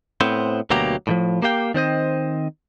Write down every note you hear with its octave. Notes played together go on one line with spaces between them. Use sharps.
A2 B3 C4 C5
D2 B2 F#3 A#3 G4 A#5
A2 D#3 F3
A#3 G4 F5 G5
D#3 C4 C5 D#5